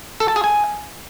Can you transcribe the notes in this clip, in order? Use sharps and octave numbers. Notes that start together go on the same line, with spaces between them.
A4
A5
G#4
G#5